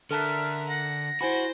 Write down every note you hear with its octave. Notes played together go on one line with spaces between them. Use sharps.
D3 A4 A#4 E5 A5 F6 F#6
F#5 A#6
E4 F#4 C5 G#5 B5